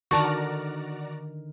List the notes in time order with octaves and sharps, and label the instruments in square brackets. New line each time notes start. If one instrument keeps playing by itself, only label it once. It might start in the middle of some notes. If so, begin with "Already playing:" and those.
[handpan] D3 D#3 A#4 [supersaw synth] F#4 D5 A#5 [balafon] A5 C#6